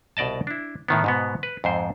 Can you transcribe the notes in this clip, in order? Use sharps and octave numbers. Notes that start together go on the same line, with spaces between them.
C2 B2 D5 D#5 A5
D4 E4
A2 D#3 B3
G#2 B2 B3
B4
F2 G#2 C5